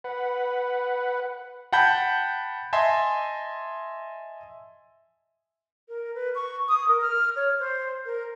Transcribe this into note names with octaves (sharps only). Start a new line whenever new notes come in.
B4 F#5
F#5 G5 A5 B5 G6
D#5 E5 G#5 A5 C6
A#4
B4
C#6
D#6
A#4
F6
C#5
C5
A#4